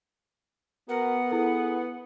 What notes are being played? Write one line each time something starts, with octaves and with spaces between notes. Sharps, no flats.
B3 F#4 A#4 F#5
E4 G#4 A4